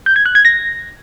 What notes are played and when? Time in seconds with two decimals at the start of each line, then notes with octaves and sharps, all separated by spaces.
0.06 G6
0.16 G#6
0.26 F#6
0.35 G#6
0.45 A#6